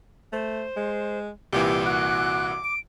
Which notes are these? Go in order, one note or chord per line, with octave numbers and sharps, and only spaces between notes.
A3 C5
G#3
C2 A#2 E3 G4 D6
F#4 F#6
D7